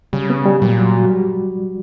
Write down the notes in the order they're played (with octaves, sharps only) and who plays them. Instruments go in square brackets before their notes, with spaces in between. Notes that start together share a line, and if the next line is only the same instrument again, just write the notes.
[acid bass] C#3 [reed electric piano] G3
[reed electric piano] B3
G3
[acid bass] A#2 [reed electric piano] F#3
[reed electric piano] F#3
F#4
G3